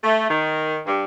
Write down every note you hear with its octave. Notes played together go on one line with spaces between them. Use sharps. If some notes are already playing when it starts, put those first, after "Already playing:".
A3
D#3
G2